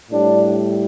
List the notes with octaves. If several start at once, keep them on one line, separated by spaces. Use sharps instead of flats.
A2 G3 D4